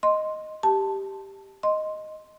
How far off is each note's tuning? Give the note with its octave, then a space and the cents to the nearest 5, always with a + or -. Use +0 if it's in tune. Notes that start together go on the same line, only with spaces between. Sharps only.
D#5 +0 C6 +0
G4 +0 A5 +0
D#5 +0 C6 +0